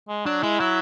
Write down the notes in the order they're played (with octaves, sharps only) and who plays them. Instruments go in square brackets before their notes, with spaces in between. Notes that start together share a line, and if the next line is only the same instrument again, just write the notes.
[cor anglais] G#3
[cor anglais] F#3 [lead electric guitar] D4
[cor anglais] G#3 [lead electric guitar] E4
[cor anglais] F#3 [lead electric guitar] E4